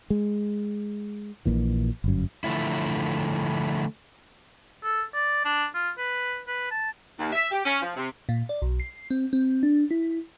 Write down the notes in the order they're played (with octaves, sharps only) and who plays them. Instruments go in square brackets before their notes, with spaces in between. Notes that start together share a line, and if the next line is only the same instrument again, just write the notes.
[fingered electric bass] G#3
A#1 A#2 E3
G1 F#2
[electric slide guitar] D3 F3 A3 E4
[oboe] A4
D5
D4
F4
B4
B4
A5
[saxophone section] D#2
E5
G4
C#4
F3
C3
[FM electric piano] A#2
D5
B1
C7
C4
C4
D4
E4